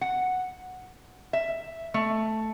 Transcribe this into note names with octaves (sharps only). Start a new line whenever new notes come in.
F#5
E5
A3